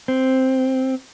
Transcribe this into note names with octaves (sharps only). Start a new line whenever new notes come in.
C4